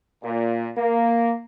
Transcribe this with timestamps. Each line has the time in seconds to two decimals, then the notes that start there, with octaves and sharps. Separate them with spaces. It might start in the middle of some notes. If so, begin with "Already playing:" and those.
0.22 A#2
0.76 A#3